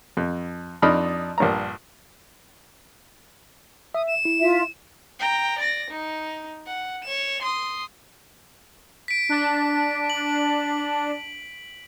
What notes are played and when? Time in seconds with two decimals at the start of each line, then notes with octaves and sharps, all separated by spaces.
0.17 F2
0.82 F2 D4 D#4 A5 B5 F6
1.38 A#1 G2 A#5
3.95 E5 D#6
4.08 E7
4.25 E4
4.40 F4 E5
5.20 G5 A#5
5.59 D5 A#6
5.91 D#4
6.67 F#5
7.03 C#5 E7
7.42 C6 D#6
9.08 B6 D7
9.29 D4
10.10 F#7